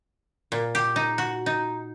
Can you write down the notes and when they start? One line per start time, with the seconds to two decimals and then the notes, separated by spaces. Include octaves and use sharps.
0.52 A#2
0.75 G4
0.96 D#4
1.18 F#4
1.46 D#4